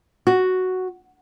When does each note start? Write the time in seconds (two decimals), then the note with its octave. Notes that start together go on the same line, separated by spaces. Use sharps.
0.27 F#4